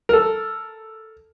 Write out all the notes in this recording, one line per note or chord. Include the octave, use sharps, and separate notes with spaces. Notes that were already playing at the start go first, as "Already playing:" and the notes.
A4 A#4